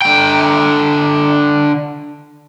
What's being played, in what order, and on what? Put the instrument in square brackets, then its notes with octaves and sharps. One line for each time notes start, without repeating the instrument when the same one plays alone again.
[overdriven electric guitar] D3 G5